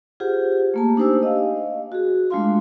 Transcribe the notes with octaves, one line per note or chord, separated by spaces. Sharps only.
F4 G4 G#4 C5 F#5
A3 A#3 A5
D4 D#4 G4 C5 G#5 E6
D#5 F5
F#4 G#4
G#3 A3 D4 F4 F5 C6